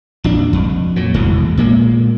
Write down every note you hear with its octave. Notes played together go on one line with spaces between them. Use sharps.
A#1 F2 D4
F2
A#2 F#3
F1 E2 A2 G#3
A#2 G#3 A#3